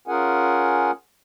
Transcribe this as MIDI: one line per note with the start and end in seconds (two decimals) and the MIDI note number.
0.08 0.91 61
0.08 0.91 65
0.08 0.91 68
0.08 0.91 70
0.08 0.91 78
0.08 0.91 80